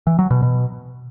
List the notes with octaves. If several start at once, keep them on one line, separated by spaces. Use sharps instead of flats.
E3
F#3
B2
B2